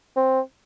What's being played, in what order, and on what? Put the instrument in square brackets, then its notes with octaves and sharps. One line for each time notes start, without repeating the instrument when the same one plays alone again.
[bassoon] C4